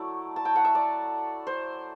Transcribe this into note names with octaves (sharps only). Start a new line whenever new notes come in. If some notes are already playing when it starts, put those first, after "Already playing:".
Already playing: F#3 A3 E4 D5
A5
G5
F#5
E5
D5
C5